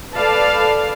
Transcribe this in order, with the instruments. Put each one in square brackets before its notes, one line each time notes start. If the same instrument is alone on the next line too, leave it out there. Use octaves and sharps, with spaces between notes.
[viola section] A4 B4 D5 F5 A5